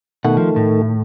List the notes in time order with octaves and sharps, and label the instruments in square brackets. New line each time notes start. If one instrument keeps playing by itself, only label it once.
[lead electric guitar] B2 F#5 [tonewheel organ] D#3 A3
[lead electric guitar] F3
A2